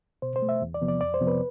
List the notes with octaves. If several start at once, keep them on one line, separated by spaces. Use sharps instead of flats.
B2 C5
C5
A3
E5
E2
D5
C3 F3 B3
D5
F2 D5
C5
C3 F3 B3
B4